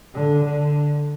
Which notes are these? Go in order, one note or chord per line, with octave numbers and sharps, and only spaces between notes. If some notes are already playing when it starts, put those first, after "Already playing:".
D3
D3